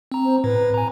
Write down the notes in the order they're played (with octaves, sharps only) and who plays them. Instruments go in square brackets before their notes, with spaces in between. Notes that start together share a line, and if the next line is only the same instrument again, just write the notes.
[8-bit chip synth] C4 A#5
[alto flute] C5
[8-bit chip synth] A2 [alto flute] B4
[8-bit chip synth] G#5 A#5